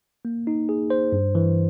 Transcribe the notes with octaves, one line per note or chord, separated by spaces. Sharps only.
A#3
D#4
G#4
C5
G2
E3